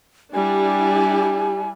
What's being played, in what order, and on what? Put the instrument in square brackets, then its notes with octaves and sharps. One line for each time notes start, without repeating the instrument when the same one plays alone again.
[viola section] G3 D4 E4 [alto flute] G4 [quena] G#5